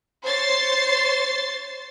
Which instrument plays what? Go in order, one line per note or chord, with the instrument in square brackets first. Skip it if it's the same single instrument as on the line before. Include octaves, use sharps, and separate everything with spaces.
[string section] C5 C#5 A6 C7